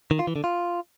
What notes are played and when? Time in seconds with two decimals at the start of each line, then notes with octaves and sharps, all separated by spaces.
0.11 D#3
0.19 F4
0.27 E3
0.36 D3
0.44 F4